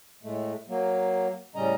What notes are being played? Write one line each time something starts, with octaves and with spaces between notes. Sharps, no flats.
A2 G#3 A3
F#3 A#3
A2 C#3 G3 C#4 D#5 A#5